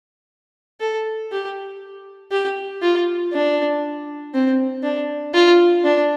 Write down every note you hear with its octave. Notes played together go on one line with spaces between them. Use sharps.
A4
G4
G4
F4
D4
C4
D4
F4
D4